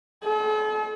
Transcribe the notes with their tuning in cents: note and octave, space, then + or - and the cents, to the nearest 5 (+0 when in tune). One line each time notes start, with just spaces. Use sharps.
A4 -45